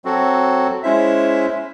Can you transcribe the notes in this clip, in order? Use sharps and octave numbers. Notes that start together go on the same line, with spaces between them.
F#3 C4 F#4 A4
G#3 C#4 E4 C5 E5